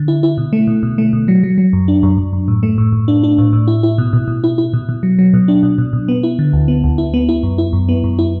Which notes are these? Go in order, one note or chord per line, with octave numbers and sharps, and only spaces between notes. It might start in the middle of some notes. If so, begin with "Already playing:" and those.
Already playing: D3
E4
E4
B2
A3
B2
B2
A3
B2
F#3
F#3
F#3
F#2
D4
F#2
F#2
F#2
A2
A3
A2
A2
D4
D4
A2
A2
E4
E4
B2
B2
B2
E4
E4
B2
B2
F#3
F#3
B2
D4
B2
B2
B2
B3
E4
D3
D2
B3
D2
E4
B3
E4
F#2
E4
F#2
B3
F#2
E4